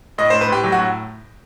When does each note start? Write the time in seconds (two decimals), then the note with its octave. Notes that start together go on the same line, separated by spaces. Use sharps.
0.18 A2 D#5
0.30 A2 C5
0.41 B4
0.49 A2 G4
0.64 F#3 G4
0.72 F#4
0.79 A2